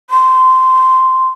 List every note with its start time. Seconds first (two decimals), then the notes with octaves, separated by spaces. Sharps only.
0.10 C6